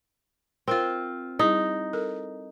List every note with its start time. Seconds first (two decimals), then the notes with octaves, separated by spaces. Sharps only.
0.68 C4 F4 A#4 C5 G5
1.39 G3 D#4 E4 G#4
1.93 A4 A#4